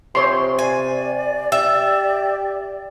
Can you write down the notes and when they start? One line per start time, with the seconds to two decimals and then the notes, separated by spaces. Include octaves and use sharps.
0.15 C3 C5 C#5 C6
0.59 D5 G#5
1.52 G4 E5